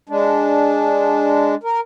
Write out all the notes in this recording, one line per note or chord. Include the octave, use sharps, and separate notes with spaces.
G#3 D4
A#4